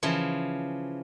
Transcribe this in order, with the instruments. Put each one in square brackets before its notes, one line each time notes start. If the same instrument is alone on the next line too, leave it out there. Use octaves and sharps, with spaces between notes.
[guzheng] C#3 E3 F3